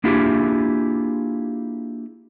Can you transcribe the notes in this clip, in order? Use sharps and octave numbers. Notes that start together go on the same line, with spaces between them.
A#3 D4 E4 F4 G4 G#4